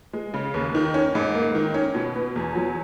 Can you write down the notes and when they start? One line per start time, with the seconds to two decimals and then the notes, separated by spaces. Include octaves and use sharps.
0.13 G#3
0.34 C#3
0.54 D#2
0.75 D#3
0.94 C#4
1.15 G#2
1.35 A#3
1.55 D#3
1.74 C#4
1.95 B2
2.16 B3
2.36 E2
2.55 F#3